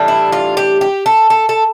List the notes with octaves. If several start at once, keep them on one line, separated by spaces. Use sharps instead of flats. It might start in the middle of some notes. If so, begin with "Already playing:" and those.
Already playing: A2 E3 G3 D4
E4
F4
G4
G4
A4
A4
A4